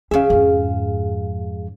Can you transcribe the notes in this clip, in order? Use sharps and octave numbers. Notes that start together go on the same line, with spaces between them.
E2 C#3 G#4 E5 F5
F2 G#2